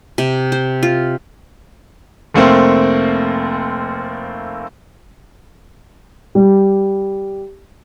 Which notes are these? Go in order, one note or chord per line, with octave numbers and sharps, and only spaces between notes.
C3
C5
F4
F1 A3 A#3 C4 C5
G3